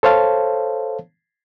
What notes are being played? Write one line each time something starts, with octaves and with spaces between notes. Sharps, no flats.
A4 C5 C#5 F5 A5